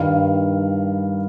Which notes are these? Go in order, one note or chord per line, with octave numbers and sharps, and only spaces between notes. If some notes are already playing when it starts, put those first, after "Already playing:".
Already playing: G2 D#3 G3 F5